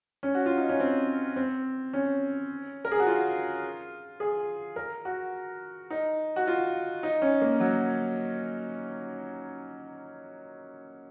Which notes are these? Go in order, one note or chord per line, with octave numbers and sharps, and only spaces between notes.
C#4
F#4
F4
D#4
C#4
C4
C4
C#4
A#4
G#4
F#4
F4
G#4
A#4
F#4
D#4
F#4
F4
D#4
C#4
A#3
F#3